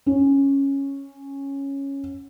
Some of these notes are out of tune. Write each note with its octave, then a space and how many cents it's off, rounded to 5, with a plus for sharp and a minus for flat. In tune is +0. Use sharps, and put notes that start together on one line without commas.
C#4 -5